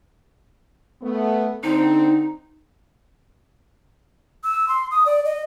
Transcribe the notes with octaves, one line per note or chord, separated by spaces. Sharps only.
A3 B3
D3 C4 D#4
E6
C6
D#6
D5
D#5